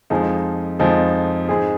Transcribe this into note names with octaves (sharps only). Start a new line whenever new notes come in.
F2 F3 G#3 D#4 G#4
F2 F3 G#3 D#4 G#4
G#2 G#3 C4 G#4